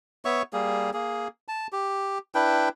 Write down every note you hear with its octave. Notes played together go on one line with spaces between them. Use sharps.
B3 C#5 E5 C#6
G3 A#3 G#4
A#3 G#4
A5
G4
D4 E4 B4 G5